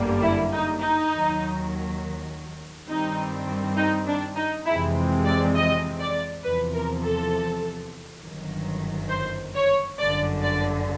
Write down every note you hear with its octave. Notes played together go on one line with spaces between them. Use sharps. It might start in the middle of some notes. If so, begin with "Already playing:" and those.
Already playing: G1 F#2 D3 G3 A#3
E4
D#4
D#4
D#2 D#3 F#3
G2 D#3 G3 C4 D#4
D#4
D4
D#4
F2 C3 E3 G#3 C4 E4
D5
D#5
D5
E2 C3 F3 B4
A#4
A4
G1 F#2 D#3 F#3
C5
C#5
G1 F#2 D3 D5
D5